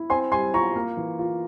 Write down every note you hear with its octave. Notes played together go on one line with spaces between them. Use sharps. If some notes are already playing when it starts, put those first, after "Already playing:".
Already playing: E4
C4 G#5 C6
G3 G#5 C6
F4 A#5 C#6
A#3
E3
F4